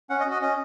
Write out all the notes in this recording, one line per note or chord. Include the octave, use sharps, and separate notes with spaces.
C#4 F#5
D#5
F#4
D#5
C#4 D#5